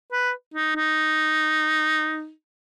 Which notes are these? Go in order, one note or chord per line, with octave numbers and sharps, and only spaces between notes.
B4
D#4
D#4